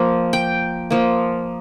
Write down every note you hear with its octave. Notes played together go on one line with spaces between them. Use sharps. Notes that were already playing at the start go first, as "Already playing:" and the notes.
Already playing: F3 A#3
G5
F3 A#3